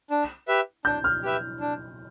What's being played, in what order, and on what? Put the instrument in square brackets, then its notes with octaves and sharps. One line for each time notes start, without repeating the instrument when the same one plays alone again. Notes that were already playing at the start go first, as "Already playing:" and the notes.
[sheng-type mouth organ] D4
G4 B4 E5
[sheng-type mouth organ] D4 [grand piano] G6
[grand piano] F6
[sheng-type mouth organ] G4 B4 E5
D4